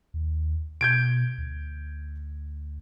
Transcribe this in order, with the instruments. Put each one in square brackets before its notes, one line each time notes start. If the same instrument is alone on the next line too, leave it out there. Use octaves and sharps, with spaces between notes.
[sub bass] D#2
[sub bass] B2 [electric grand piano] G6 G#6 D7
[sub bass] D2